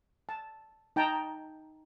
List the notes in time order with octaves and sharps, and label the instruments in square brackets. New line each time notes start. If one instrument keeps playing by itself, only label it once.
[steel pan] A5
D#4 G5 A5 A#5